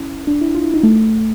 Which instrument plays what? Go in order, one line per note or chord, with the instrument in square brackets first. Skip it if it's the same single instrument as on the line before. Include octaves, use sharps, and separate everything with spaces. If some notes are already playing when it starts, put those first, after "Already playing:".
Already playing: [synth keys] C#4 E4
D4
E4
F4
E4
D#4
A3